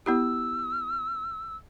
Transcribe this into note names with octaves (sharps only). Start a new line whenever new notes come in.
B3 E4 G4 E6